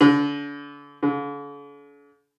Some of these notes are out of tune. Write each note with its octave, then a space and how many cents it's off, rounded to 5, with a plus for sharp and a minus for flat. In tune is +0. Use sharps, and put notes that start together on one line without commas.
D3 -30
D3 -40